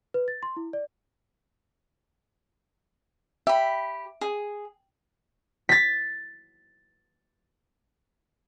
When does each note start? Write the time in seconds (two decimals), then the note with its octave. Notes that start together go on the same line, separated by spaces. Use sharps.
0.14 B4
0.28 A6
0.43 C6
0.57 E4
0.73 D5
3.47 G4 E5 B5
4.21 G#4
5.69 A6 B6